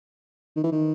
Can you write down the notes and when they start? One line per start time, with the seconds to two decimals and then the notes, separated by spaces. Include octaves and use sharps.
0.57 D#3
0.64 E3
0.72 D#3